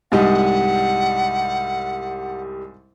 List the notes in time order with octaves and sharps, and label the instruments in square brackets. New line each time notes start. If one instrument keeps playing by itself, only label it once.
[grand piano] C2 G3 [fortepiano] G#2 D#5 D#6 [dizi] F#5